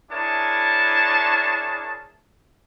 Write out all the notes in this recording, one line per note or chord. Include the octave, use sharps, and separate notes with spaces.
D4 E4 G#4 A#4 C#5 A5